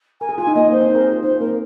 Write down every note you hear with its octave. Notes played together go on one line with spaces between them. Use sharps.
A#4 G#5
G#4
F4 G#5
D#4
A#3 D#5
C4
A#3 C5
C4
D#4
A#4
G#4
F4
D#4 C5
C4
A#3 A#4
C4